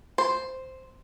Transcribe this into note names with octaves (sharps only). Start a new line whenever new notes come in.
C5